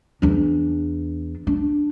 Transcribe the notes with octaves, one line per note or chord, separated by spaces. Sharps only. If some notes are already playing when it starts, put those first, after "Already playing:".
E2 D4
D4